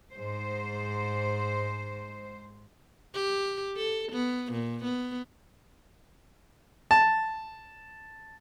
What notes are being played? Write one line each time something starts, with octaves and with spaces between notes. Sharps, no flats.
G#2 C5
G4
A4
B3
A#2
B3
A5